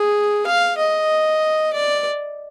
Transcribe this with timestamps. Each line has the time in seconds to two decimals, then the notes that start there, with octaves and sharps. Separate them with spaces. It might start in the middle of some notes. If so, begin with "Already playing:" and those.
Already playing: G#4
0.47 F5
0.78 D#5
1.73 D5